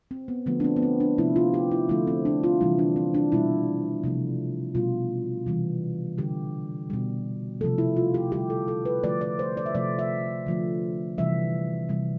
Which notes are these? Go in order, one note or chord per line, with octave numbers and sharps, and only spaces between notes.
C4
B3
D3 F3 A3 B3
D4
C4
B3
C4
D4
C3 F3 A3 E4
F4
G4
E4
D3 F3 A3 E4
C4
D4
F4
C3 E3 G3 E4
D4
C4
D4
B2 G3 E4
C3 F3 A3
B2 G3 F4
C3 E3 G3
D3 G3 G4
B2 G3
C3 F3 A3 A4
E4
F4
G4
D3 G3 G4
A4
A4
B4
D3 F3 A3 D5
D5
C5
D5
E5
C3 F3 A3 D5
E5
D3 F3 A3
C3 E3 G3 E5
C3 E3 G3